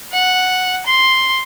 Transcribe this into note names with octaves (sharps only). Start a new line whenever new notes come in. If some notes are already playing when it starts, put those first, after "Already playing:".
F#5
C6